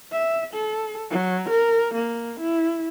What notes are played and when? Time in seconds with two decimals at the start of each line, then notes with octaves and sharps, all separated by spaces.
0.12 E5
0.54 A4
1.11 F#3
1.49 A#4
1.94 A#3
2.40 E4